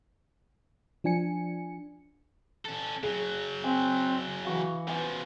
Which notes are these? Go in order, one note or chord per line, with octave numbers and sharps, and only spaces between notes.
F3 D4 G#5 C#7
C#4 A4
C#3 F#3 G#4
C4 G#5
E3 F#4 F5
C#3 F3 B3 F#5 G#5